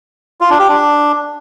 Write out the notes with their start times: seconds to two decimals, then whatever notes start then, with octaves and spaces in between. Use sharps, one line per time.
0.41 F4
0.50 D4
0.59 G4
0.68 D4